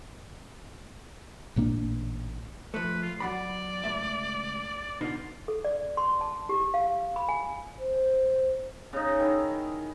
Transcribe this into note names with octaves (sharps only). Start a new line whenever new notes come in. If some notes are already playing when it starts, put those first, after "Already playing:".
A1 A#2 A#3 D4
F3 A3 B4
F4
F#3 D5 F#5 B5
C#2 A3 E5
B2 D3 D#4 F4
A4
D5
C6
A5
G4
F5
B5
G#5
C5
C#3 D#4
D#3 E4